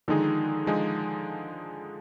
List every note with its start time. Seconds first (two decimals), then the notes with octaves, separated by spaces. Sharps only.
0.08 D3 D#3 F3 G#3 D#4 G#4
0.66 D3 F3 G#3 D#4 G#4